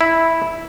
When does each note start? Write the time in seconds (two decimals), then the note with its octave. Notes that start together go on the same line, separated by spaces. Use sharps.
0.01 E4